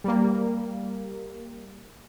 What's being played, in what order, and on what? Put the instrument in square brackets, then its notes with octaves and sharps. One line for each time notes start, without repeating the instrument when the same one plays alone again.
[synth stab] G3 A#3